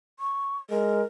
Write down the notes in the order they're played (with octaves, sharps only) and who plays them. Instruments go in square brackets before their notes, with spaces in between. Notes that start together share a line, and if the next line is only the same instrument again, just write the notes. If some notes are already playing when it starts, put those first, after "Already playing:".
[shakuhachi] C#6
[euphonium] G#3 [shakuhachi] A#4